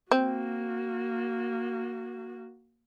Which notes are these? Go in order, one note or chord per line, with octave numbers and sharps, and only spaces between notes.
A#3 C4 F#4